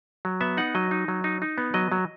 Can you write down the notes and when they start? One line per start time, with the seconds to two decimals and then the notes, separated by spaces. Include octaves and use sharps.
0.25 F#3
0.41 B3 E5
0.57 D#4 F#5
0.75 F#3 D#5
0.91 D#4
1.08 F#3
1.24 D#4
1.42 D#4
1.58 B3
1.74 F#3 D#5
1.92 F#3